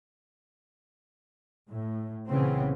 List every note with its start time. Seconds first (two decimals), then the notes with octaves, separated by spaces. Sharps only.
1.69 A2
2.29 C2 A#2 C#3 E3 B3 C4